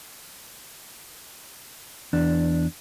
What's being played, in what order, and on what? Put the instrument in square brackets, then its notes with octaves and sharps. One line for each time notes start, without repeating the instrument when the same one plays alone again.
[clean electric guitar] E2 D4